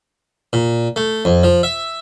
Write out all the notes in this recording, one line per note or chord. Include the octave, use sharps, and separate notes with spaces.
A#2
A3
F2
F3
E5